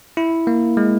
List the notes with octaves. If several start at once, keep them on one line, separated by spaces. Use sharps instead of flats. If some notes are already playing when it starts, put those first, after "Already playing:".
E4
A#3
G#3